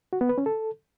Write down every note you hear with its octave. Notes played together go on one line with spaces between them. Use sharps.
F#4
B3
B4
C#4
A4